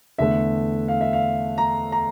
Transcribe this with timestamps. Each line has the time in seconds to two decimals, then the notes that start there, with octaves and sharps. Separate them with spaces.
0.18 E2 D3 A3 E5
0.88 F5
1.01 E5
1.13 F5
1.58 A#5
1.92 A#5